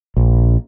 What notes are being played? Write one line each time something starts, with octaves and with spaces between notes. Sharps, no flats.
A#1